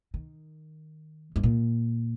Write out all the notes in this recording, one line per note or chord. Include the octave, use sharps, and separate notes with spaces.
D#3
G2
A#2